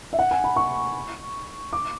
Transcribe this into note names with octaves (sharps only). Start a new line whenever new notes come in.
E5
F#5
G#5
B5
C#6
D6